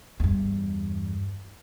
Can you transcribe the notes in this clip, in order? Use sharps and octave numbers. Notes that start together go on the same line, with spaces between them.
E2 G2